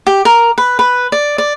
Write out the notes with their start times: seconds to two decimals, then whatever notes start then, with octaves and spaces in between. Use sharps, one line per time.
0.07 G4
0.25 A#4
0.58 B4
0.79 B4
1.12 D5
1.38 D5